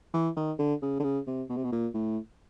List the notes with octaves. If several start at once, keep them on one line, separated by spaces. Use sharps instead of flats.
E3
D#3
D3
C#3
D3
C#3
C3
B2
C3
B2
A#2
A2